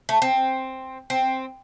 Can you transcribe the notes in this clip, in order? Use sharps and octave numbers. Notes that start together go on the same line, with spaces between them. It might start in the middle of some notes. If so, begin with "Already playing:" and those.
A3
C4
C4